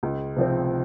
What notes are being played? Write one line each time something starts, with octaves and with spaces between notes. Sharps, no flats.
C#2
C3 F3 C4